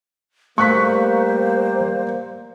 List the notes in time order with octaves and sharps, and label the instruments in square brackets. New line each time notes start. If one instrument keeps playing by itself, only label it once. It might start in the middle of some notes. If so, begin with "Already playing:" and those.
[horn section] G3 A#3 [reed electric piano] A3 F5 [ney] C5 [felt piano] C#6 F#6 B6